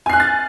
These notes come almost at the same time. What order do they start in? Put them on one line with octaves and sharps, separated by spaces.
G#5 C7 F#6 F6 A6